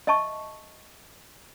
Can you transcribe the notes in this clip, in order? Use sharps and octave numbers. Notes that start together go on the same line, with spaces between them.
D#5 E5 A5 C#6